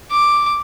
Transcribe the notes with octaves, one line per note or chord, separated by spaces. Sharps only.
D6